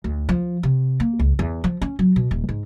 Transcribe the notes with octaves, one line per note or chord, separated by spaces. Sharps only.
D2
F3
C3
A#3
C#2
E2
F3
C#4
F#3
B2
D#1
G#2